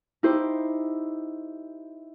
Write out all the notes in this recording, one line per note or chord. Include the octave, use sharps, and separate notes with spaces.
D#4 E4 G4 C5